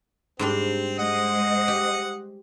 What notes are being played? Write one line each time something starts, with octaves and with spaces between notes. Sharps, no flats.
G#2 G3 C4 D4
G#3 C5 D#5 F#5 D#6
G4